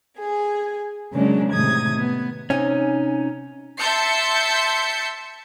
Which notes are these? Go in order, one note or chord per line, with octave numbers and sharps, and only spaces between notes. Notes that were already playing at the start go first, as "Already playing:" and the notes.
G#4 G#5
C#3 F#3 G#3 A#3 C#4 D4
A2 C3 D#3 D#6 G#6
B3
C3 C#4 D#4 G#5
E5 A5 C6 E6 G6 C#7